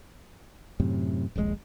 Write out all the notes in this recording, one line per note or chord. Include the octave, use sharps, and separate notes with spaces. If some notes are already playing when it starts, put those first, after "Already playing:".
F#2 A2 C3
D#1 A#1 B2 G#3